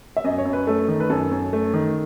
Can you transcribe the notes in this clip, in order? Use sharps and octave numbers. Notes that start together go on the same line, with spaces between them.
E5
F#2 D#5
C#5
F#2
B4
A3 A4
D#3
B4
F#2 A4
F#2
A3
D#3